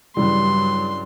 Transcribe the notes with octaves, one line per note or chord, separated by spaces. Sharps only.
G2 C#3 E3 F#3 G3 C6